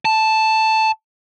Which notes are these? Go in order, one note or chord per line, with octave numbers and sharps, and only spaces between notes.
A5